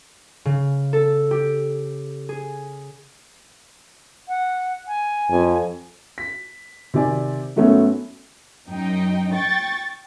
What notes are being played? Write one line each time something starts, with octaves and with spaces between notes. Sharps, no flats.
C#3
A4
G4
G#4
F#5
G#5
F2
B6
C3 D#3 D5 G#5
G#2 F#3 A3 B3 C#4
F#2 D#4 G5
G5 C#6 A6